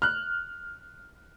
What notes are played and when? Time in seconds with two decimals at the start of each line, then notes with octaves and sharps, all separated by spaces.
0.02 F6 F#6